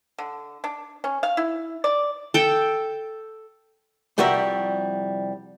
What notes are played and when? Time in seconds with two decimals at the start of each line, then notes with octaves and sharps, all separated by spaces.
0.18 D3
0.64 D4
1.04 C#4
1.23 F5
1.37 E4
1.84 D5
2.34 A4 G5
4.18 C2 F3 G3 F#4 A#4 E5